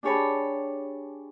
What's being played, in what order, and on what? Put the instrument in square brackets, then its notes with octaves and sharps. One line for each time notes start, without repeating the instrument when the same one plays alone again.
[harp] D4 G4 G#4 C#5 A5 B5